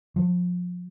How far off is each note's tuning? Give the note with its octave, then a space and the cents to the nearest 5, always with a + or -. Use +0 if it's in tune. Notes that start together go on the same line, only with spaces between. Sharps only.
F3 +30